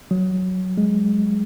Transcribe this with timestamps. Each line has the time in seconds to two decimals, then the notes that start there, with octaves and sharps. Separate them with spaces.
0.11 F#3
0.78 G#3